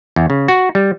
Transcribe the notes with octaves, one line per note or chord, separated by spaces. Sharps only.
E2
C#3
F#4
G3